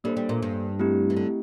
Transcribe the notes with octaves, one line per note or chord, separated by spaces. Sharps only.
G3 A#3 D4 A4 C5
G3
A#2
G2
A3 C4 E4 G4
E3
D3